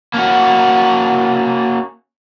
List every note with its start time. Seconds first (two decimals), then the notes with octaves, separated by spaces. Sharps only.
0.14 A#3 C#4 F#4